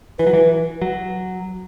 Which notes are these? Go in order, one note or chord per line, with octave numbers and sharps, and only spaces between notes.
E3 B4
F#3
E3
F#3